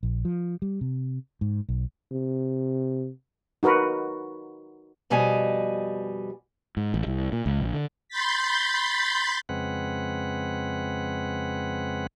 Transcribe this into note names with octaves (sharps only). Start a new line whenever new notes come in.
A#1
F3
G3
C3
G#2
B1
C3
D#4 F#4 A#4 B4
F2 B2 G3 D#5 G#5
G#2
A1
C2
A#2
C#2
A#1
D3
B5 C6 G6 A6 B6
F2 C#3 G#3 C4 B4 F#5